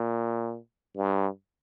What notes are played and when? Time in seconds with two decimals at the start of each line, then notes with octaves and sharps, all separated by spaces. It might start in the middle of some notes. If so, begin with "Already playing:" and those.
Already playing: A#2
0.97 G2